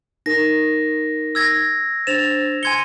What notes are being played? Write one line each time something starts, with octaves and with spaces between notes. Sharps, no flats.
D#4 A#4 A#6
E6 G#6 A#6
D4 C5 A6 E7 F7
G#5 C6 G#6 C#7 G7